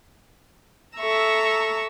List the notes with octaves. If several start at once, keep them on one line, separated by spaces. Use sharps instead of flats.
A4 E5 A#5 C#6 E6